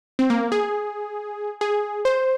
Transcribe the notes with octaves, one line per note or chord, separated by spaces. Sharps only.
C4
A#3
G#4
G#4
C5